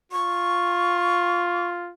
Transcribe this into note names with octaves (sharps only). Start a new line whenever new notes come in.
F4 C#6